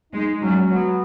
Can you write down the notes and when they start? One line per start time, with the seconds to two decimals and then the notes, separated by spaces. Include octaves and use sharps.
0.13 G#3 D#4
0.42 F#3 C#4
0.70 F#3 B3